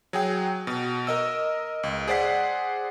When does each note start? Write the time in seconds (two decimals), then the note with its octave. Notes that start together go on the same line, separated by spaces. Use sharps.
0.13 F#3 G#4 G5
0.67 B2
1.07 A#4 D#5 E6
1.83 C#2
2.08 G#4 C5 D5 F#5 B6